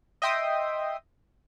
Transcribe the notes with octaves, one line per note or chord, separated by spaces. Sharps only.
D#5 E5 G5 C6 D#6